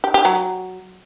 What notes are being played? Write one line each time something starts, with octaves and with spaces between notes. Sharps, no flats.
G4
G4
F#3